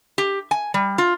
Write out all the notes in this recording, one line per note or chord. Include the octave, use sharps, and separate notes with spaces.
G4
G#5
G3
F4